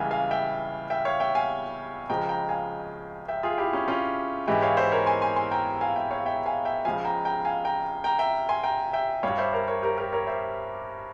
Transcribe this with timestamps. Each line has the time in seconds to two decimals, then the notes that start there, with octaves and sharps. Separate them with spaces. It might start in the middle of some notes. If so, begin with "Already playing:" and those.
Already playing: C#2 C#3 E3 G3 E5 F5 G5 G#5
0.11 F5 G#5
0.31 E5 G5
0.90 E5 G5
1.05 C#5 F5
1.20 E5 G5
1.35 F5 G#5
2.09 C#2 C#3 F3 G#3 G5 A#5
2.29 G5 A#5
2.49 F5 G#5
3.28 E5 G5
3.43 F4 G#4
3.58 E4 G4
3.73 C#4
3.88 C#4 F4
4.47 G#2 E3 G#3 E4 G4
4.62 C#5 F5
4.77 C5 E5
4.92 A#4 C#5
5.06 G#5 C6
5.22 G#5 C6
5.36 G#5 C6
5.51 G5 A#5
5.81 F5 G#5
5.96 E5 G5
6.11 C#5 F5
6.26 E5 G5
6.46 F5 G#5
6.65 E5 G5
6.85 C#2 C#3 F3 F5 G#5
7.05 G5 A#5
7.25 G5 A#5
7.45 F5 G#5
7.65 G5 A#5
8.04 G5 A#5
8.19 E5 G5
8.49 G#5 C6
8.63 G5 A#5
8.93 E5 G5
9.23 G2 G3 C#5 F5
9.38 C5 E5
9.53 A#4 C#5
9.68 A#4 C#5
9.82 G4 A#4
9.98 G4 A#4
10.13 A#4 C#5
10.27 C5 E5